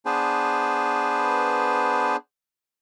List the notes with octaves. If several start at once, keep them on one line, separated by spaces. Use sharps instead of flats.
B3 D4 G#4 B4 C5